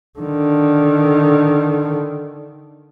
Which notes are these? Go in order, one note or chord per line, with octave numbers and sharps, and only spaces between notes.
D3 D#3